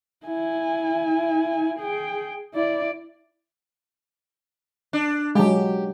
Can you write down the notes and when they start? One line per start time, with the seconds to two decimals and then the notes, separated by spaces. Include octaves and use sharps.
0.26 E4 G#5
1.79 G#4 G5
2.54 E4 D5
4.93 D4
5.35 F#3 G#3 G4